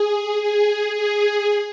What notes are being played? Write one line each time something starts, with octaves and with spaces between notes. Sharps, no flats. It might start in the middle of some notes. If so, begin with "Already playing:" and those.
Already playing: G#4
G#4
G#4